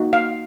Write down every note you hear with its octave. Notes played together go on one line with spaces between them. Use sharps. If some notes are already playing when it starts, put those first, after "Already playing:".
Already playing: A#3 D#4 F#4
F5